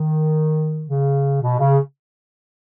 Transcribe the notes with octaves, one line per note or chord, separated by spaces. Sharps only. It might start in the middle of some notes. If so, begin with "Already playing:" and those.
Already playing: D#3
C#3
B2
C#3